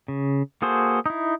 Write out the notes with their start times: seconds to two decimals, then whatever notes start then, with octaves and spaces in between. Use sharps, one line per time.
0.08 C#3
0.62 A#3 F#4 G#4 A4 C5
1.06 D#4 E4